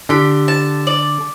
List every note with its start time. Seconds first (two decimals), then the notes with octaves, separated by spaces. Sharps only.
0.09 D3 G4
0.48 A5
0.87 D5